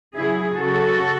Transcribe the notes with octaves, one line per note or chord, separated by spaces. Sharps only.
C#3 F#3 E4 G#4
C#3 F#3 F#4 A4